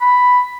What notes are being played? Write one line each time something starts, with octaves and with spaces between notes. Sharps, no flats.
B5